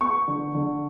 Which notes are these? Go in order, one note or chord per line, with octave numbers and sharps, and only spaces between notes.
B3 C#6
D3
D3